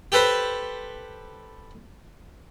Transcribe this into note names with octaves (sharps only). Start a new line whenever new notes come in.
G4 A4 B4 C5